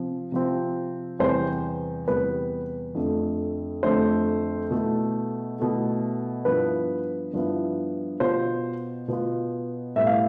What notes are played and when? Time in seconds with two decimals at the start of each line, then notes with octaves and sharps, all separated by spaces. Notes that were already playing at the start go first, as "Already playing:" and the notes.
Already playing: C3 F3 C4
0.32 C3 F3 C4
1.19 E2 C3 G3 B3 C5
2.08 E2 C3 G3 B3 B4
2.95 F2 D3 A3
3.83 F2 D3 A3 C5
4.71 B2 A3 E4
5.58 B2 A3 E4
6.45 G2 F3 B3 E4 B4
7.33 G2 F3 B3 E4
8.20 B2 B3 F4 C5
9.08 B2 B3 F4
9.95 A2 G3 B3 E4 E5
10.07 F5